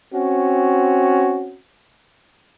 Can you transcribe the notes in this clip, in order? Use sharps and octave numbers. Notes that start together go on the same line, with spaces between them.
C4 C#4 F#4